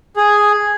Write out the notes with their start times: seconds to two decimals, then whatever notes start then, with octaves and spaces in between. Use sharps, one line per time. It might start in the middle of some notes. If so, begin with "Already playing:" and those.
0.16 G#4